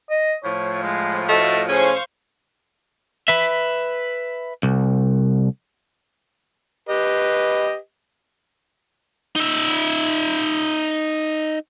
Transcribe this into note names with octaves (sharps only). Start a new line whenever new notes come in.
D#5
A2 F3 C#5
G#3
A3 F#4 A4 D#5
C#4 G#4 C5 F5 C#6
B4 E5
C2
G4 B4 D#5
D#4 E5